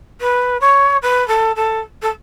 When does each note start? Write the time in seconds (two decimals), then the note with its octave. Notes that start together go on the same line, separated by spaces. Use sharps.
0.20 B4
0.60 C#5
1.02 B4
1.27 A4
1.55 A4
2.02 A4